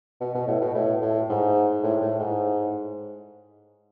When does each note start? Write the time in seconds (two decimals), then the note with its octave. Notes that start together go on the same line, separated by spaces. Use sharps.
0.21 B2
0.35 B2
0.47 A2
0.61 B2
0.75 A2
1.02 A2
1.30 G#2
1.83 A2
2.02 A2
2.19 G#2